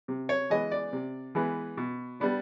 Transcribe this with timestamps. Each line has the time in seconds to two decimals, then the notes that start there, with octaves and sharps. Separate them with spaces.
0.08 C3
0.29 C#5
0.50 E3 G#3 B3 D#5
0.71 D5
0.93 C3
1.35 E3 G#3 B3
1.77 B2
2.20 G3 B3 D4